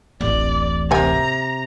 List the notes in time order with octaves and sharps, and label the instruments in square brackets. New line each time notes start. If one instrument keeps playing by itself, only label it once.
[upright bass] D1 A1 [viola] D5
[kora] C3 [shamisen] A#3 F#5 G#5 [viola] A#5